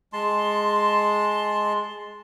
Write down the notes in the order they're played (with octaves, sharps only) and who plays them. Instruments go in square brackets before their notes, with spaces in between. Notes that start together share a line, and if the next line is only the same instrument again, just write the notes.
[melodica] G#3 A5 C6